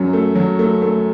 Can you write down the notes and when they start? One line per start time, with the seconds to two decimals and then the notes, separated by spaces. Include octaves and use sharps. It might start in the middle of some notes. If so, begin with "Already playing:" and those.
Already playing: F#2 F#3
0.13 A3
0.35 F#3
0.59 A3
0.82 A3